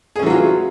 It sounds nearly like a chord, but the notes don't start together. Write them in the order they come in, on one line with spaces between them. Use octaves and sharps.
G#4 C#4 E3 F#3 F4